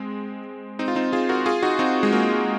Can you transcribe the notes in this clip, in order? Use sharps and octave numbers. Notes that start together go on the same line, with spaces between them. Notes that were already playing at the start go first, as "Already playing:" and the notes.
Already playing: G#3 C4
C4 D#4
F4
C4 D#4
F4 G#4
F#4 A#4
F4 G#4
D#4 F#4
C4 D#4
G#3
A#3